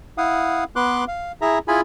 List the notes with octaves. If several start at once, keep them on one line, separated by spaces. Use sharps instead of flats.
E4 F5 F#5 D#6
B3 B4 C6 D6 F#6
F5
E4 G#4 E5 A#5
E4 F4 G#4 G#5 B5